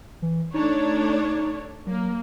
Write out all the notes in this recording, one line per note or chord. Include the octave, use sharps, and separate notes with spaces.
E3
A3 D4 D#4 C#5
F#3 A#3